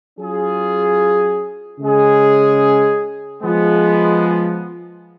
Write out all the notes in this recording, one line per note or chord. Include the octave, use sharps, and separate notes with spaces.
F#3 C#4 F4 G#4
C#3 G#3 C#4 G#4
F3 G#3 B3